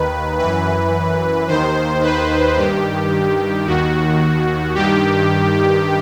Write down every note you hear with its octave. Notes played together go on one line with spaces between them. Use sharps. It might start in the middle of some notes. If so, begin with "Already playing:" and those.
Already playing: D#2 D#3 B4
F#2 E3 B4
D#2 D#3 C5
B4
G2 D#3 G4
D#2 D#3 F#4
G2 D#3 G4